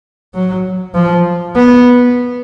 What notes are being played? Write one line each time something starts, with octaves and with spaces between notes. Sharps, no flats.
F#3
F3
B3